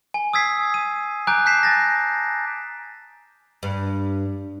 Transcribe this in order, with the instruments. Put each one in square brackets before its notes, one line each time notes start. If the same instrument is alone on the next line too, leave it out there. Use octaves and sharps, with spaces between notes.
[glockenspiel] G#5
D#6 E6 G#6 B6 C7
D#7
G#5 A#5 D6 F#6 G6 D7
A5 F#6 G6 B6 C7 E7
G#5 A6 A#6
[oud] G2